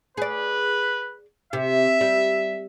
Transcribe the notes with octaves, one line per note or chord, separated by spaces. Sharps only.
G#4 B4 D5
C3 E5
G3